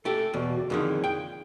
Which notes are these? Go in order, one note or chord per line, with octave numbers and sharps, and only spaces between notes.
A3 G4 A4
E2 B2
C#2 D3 D5
F2 A#2 D3 D#3 E4 G#4
G5